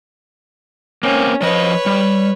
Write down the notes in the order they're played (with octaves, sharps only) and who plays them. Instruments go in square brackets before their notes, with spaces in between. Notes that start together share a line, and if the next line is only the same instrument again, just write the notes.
[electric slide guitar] A#3 C4 [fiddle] C#4
[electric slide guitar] F3 D#5 [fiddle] B4 C#5
[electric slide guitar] G3